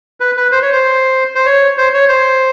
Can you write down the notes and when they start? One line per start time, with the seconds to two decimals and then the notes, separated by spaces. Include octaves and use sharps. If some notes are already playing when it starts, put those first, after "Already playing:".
0.20 B4
0.37 B4
0.52 C5
0.62 C#5
0.72 C5
1.35 C5
1.46 C#5
1.77 C5
1.94 C#5
2.08 C5